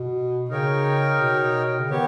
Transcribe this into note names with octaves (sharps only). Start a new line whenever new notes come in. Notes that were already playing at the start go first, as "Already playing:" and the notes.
Already playing: B2
C#3 D#4 A#4 C#5 G5
B2
C#3
D#3 B3 G4 C#5